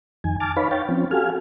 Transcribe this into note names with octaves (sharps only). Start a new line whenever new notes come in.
F2 D#3 G#5
G#5 A5 D6 F6 A6
D#4 B4 C#5 F5 B5
C#5 F5 G5 A6
F3 C4 C#4
F#4 G4 A4 F5 G#5 F6